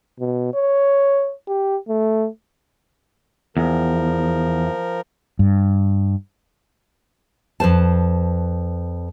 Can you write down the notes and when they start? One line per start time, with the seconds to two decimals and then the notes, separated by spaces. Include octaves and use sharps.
0.20 B2
0.54 C#5
1.48 G4
1.89 A3
3.57 E2 F3 A#4
5.39 G2
7.60 F2 B4 C5 A5